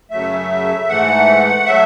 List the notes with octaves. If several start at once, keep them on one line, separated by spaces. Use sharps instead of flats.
F#2 C#3 F#3 A3 E5
G#2 E3 A3 F#5
F#3 A3 E5